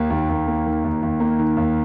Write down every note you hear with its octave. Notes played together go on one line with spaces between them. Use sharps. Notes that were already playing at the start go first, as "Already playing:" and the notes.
Already playing: D#2 D#3 A#3
D#2
D#2
A#3
D#3
D#2
D#2
A#3
D#3
D#2